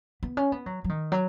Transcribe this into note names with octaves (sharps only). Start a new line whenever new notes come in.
B3
C#4
B3
F#3
F#3
D#3
F#3